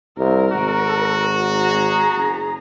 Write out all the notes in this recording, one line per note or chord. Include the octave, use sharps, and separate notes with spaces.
C2 A#4
G#1 F#4
G#4 A#5
F#1